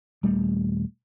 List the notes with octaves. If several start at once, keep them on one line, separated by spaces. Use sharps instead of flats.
D#1 G3 A3